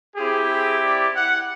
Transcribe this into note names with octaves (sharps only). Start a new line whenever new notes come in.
C4 E4 G4 G#4
G#4
D5
F#5